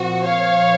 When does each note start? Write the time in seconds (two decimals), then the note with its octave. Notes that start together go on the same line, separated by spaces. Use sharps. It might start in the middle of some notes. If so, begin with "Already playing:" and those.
Already playing: A#2 F3 C4 F#4
0.25 C#5 F5